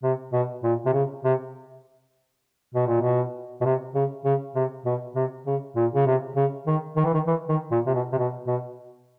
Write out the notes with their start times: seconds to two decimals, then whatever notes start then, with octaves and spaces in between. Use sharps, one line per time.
0.03 C3
0.33 B2
0.64 A#2
0.86 C3
0.94 C#3
1.25 C3
2.75 B2
2.87 A#2
3.02 B2
3.61 B2
3.65 C3
3.95 C#3
4.25 C#3
4.56 C3
4.85 B2
5.15 C3
5.47 C#3
5.76 A#2
5.95 C#3
6.06 C3
6.36 C#3
6.67 D#3
6.97 D#3
7.05 E3
7.14 D#3
7.27 E3
7.49 D#3
7.72 A#2
7.87 C3
7.94 B2
8.13 C3
8.18 B2
8.47 B2